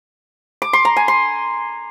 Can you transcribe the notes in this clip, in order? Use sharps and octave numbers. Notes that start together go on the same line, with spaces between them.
D6
C6
A#5
G#5
C6